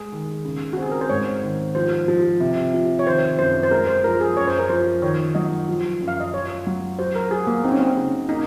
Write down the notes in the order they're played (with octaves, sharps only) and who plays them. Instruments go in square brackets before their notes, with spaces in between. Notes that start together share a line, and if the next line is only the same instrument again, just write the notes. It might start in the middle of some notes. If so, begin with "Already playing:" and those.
Already playing: [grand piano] G#3 [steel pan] G#4
[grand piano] D#3
C#3
[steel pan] F#4
[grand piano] C4
[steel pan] G#4
A#4
C5
[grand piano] G#2 [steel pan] C#5
[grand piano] D#3
[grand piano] F3 [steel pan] C5
[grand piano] F3
C3
F3
[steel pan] C#5
[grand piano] D#3 [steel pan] C5
[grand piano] F#2 [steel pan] C5
[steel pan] C5
[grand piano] G#3 [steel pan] A#4
[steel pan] C5
[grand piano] F3 [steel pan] A#4
[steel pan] G#4
[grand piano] F#2 [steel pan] C#5
[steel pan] C5
A#4
[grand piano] F3 [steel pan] C5
[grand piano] D#3 [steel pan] C#5
[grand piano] F#3 [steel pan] D#5
[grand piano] F3
F#2
[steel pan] F5
D#5
[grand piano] F4 [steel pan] C#5
[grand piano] F#3
[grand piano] F#4 [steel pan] C5
[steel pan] A#4
[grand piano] F#4 [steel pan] G#4
[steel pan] A#3
[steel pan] C4 [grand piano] D#4
[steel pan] C#4
C4
[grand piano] C#3
[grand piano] A#3 [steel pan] D#4